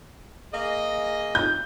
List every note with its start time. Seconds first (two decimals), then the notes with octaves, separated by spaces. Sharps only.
0.52 A#3 G#4 D#5
1.35 G6